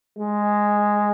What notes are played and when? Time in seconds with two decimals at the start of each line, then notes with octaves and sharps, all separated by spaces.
0.18 G#3